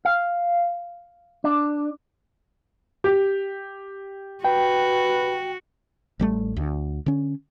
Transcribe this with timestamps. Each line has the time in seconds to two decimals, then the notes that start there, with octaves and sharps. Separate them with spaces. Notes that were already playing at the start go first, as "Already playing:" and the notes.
0.05 F5
1.44 D4
3.04 G4
4.45 F#4 B4 G5
6.20 A1 G3 A3
6.56 D2
7.06 D3 C#4